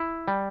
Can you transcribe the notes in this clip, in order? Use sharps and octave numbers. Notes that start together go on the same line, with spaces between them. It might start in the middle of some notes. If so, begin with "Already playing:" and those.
Already playing: E4
G3